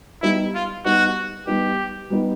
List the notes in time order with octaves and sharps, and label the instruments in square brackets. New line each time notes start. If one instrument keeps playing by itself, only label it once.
[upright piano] G3 B3 D#4 [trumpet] E4
[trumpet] F4
[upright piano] G3 B3 D#4 [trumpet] F#4
[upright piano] G3 B3 D#4 [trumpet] G4
[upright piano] G3 B3 D#4